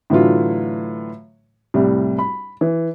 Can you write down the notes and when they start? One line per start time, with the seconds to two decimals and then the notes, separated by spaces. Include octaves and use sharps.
0.10 A2 D3 E3 F#3 A3 F4
1.74 C2 A2 G3
2.19 B5
2.61 E3